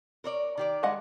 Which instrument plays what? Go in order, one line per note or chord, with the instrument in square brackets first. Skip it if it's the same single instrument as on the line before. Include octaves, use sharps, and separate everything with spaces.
[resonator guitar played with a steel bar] A#4 C#5 D5
D#3 G4 D5
[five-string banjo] G#3 D#5 F#5